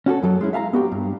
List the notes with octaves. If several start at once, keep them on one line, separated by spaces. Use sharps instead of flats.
C#4 F#4 G4 A4
F#2 F#3 A4
G#3 C#4 E4
E5 F5 A5 A#5
B3 F#4 G4
G2